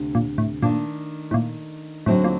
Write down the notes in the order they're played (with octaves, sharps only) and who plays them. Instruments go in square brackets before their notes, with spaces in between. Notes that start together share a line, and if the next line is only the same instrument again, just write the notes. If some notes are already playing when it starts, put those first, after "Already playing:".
Already playing: [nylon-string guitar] D2 C3 A3 D4
[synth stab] A#2
A2
[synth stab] A#2 [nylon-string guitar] D#3 A3 D4
[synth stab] A2
A#2
[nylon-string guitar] D2 D3 F#3 C4 D#4 [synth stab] A2
[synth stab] A#2